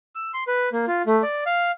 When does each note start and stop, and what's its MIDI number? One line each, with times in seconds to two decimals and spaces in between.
0.15 0.31 88
0.34 0.44 84
0.47 0.69 71
0.72 0.86 58
0.87 1.02 65
1.06 1.22 57
1.23 1.44 74
1.46 1.71 77